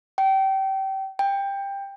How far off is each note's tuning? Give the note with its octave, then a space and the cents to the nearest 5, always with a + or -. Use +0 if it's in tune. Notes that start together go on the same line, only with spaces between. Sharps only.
G5 -25
G5 +15